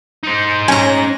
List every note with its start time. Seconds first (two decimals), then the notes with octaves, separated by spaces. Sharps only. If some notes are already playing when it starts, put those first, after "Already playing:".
0.24 D#4 C5
0.68 C#4 G#5 A#5